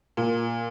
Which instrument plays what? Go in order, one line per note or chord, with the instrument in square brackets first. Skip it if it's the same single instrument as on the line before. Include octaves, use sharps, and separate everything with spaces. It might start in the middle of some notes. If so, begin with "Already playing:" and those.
[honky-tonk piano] A#2